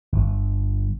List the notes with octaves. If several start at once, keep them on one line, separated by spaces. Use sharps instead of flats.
G1